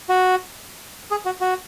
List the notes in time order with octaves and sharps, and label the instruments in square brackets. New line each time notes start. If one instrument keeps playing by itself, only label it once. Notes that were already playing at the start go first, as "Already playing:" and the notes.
[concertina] F#4
G#4
F#4
F#4